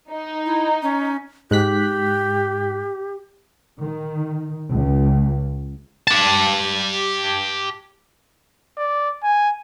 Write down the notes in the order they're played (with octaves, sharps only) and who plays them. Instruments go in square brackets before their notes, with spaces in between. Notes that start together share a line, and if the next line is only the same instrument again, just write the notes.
[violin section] D#4
[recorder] E4
C#4
[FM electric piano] G#2 F#6 B6 [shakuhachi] G4
[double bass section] D#3
C#2
[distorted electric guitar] G4 A5
[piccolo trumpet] D5
G#5